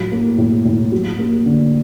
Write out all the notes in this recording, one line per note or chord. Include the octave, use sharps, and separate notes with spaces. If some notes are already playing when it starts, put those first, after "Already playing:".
Already playing: A2 F#3
A#3
A2
A2
F#3
A#3
D3